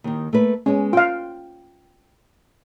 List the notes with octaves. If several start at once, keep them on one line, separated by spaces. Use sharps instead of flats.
D#2 D#3
A3 A#3 B4
G#3 B3 C#4
F4 F5 G5